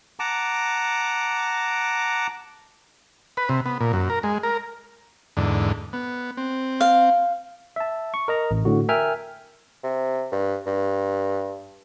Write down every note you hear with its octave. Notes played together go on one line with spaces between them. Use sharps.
F#5 A5 A#5 D6
B4
C3
B3
A#2
F#2
A#4
G#3
A#4
E2 G#2 D3
B3
C4
F5
E5 A5
C#6
A#4 D#5 A#5
A1
A2 D3 F#4
A#4 E5 G5 G#5 F6
C3
G2
G2